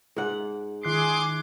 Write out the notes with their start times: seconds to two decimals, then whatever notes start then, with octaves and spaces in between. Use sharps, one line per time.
0.16 G#2 F#5
0.83 D#3 G#4 C6 D6 F#6 C7